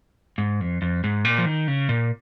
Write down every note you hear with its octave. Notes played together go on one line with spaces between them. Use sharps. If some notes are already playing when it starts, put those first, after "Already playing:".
G#2
F2
F2
G#2
A#2
F3
D#3
C#3
A#2